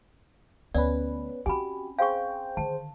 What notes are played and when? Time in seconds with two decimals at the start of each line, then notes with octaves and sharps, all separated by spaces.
0.74 D2 A3 B3 C#4 B4 D5
1.46 C4 C#4 F#4 G4 G#5 B5
1.99 G#4 C5 F5 G5 C#6
2.57 D3 D#3 A5